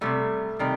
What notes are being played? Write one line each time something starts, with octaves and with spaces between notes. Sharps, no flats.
C3 D#3 G3 A3
C3 D#3 G3